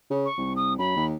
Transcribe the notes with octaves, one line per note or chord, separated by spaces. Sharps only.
C#3
C#6
C2
D#6
F#2 B5
D#2